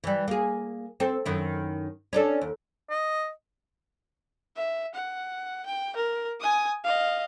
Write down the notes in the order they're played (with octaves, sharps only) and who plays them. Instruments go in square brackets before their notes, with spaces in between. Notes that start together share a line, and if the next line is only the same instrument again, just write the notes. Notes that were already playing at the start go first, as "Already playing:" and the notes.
[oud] E3 G3
A#3 G#4
C4 A4
F#2 D#3 E4
C#4 D4 A4
D#2
[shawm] D#5
[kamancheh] E5
F#5
G5
A#4
G#5 D#6
D#5 F5